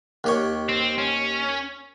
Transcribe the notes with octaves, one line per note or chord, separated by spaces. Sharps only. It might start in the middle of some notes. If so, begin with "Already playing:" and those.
D#2 G4 C#5
C4
C#4